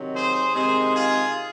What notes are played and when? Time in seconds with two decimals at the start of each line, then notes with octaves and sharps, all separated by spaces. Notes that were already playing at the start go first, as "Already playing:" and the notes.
Already playing: C3 D#3 F#3
0.15 G#4 C5
0.54 C3 D#3 G#3 G#4 C5
0.94 F4 G#4